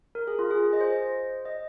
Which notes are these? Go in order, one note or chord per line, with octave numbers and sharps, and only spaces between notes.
A#4
G#4
F4
G#4
D#5
C5
D#5